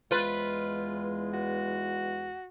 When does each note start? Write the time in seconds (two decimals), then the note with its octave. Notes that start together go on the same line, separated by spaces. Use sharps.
0.11 E2 G#3 F4 B4
1.33 F#4